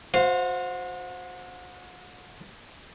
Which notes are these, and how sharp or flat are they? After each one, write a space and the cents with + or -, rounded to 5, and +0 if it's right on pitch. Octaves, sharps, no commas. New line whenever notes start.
F#4 -35 C5 +0 F5 +0